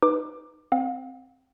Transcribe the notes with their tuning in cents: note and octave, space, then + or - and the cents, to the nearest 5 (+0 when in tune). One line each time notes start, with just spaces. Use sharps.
D#4 +0 B4 +0 D6 +20
C4 +0 F5 +40